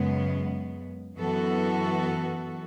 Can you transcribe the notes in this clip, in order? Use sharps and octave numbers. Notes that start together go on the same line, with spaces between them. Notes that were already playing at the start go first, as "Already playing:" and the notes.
Already playing: F#2 C#3 G#3 B3
F#2 E3 B3 F#4 A4